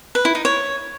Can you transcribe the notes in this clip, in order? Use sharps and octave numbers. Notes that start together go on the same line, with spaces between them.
B4
E4
D#4
C#5